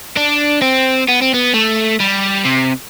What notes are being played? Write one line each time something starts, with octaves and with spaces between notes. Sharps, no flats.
D4
C4
B3
C4
B3
A3
G3
C3